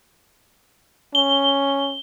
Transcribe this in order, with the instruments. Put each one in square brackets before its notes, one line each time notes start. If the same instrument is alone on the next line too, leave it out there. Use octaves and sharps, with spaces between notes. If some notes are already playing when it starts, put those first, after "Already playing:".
[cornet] C#4 [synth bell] G7